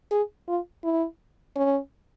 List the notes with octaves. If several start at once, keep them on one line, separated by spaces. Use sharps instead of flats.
G#4
F4
E4
C#4